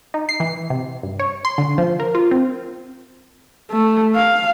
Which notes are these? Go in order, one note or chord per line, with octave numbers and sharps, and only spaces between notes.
D#4
C7
E3
C3
G2
C#5
C6
D3
F3
A#4
F4
C4
A3
F5